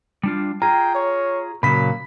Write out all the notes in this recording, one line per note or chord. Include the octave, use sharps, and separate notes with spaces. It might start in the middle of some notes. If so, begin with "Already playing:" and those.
G3 D4 F4
F4 G#4 G5 A#5
C#5
A#2 C#3 F#3 A#3 B5 B6